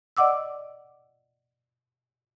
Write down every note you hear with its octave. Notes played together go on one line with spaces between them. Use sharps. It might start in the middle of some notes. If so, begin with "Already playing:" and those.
D5 D#5 F#5 D6 E6